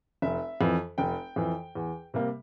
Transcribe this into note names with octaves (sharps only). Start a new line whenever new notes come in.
F1 E5
F2 E3
F1 G5
F2 E3
E2
C3 G3 A#3